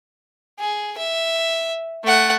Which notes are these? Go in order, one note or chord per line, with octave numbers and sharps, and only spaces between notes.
G#4
E5
A3 F#5